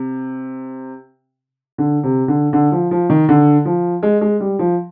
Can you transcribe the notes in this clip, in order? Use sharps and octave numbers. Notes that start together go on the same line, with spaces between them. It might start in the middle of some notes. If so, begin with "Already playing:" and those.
Already playing: C3
D3
C3
D3
D3
F3
F3
D#3
D3
F3
G#3
G#3
G3
F3